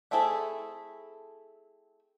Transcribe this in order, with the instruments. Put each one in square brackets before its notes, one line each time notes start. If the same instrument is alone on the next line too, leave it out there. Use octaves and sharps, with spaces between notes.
[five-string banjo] A3 C4 E4 G#4 A4